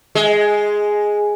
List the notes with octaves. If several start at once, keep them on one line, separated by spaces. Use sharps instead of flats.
G#3